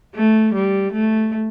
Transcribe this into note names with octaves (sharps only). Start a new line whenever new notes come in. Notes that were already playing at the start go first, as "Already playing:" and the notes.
A3
G3
A3